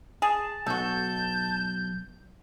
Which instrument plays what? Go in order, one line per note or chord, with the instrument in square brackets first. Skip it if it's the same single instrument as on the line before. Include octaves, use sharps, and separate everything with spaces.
[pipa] G#4 [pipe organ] A5
[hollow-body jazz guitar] B1 [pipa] F#4 A4 [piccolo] G6